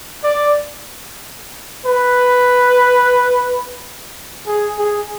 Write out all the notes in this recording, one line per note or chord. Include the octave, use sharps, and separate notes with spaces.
D5
B4
G#4
G#4